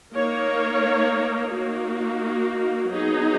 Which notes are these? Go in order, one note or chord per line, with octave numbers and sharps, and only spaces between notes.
A#3 D#4 A#4 C#5
A#3 D#4 F#4
F#3 B3 D#4 G#4